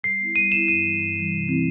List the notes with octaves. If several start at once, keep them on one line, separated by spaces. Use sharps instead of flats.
G3 C7
B3 E4
G3 D#7
B3 E4 E7
G2 D#7
E3 G3
G2
E3 G3
C3
E3 A3 C4 E4